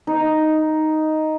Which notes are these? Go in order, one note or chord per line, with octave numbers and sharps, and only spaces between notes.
D#4